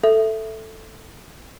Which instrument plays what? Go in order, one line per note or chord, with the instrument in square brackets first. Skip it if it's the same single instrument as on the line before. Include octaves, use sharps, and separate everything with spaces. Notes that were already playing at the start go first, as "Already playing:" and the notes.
[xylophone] A4 E5